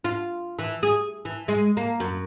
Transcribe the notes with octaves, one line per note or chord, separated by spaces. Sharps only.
F4
E3
G#4
E3
G#3
A#3
F#2